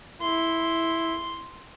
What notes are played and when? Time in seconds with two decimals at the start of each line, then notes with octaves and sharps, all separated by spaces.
0.21 E4 C6